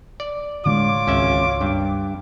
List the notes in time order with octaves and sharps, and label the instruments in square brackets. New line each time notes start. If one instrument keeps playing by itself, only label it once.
[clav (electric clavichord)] D5
[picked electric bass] A2 D3 G#3 [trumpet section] F4 C#5 D6
[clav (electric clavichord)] G#1 C#4 E5 [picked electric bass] C#2
[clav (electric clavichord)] G2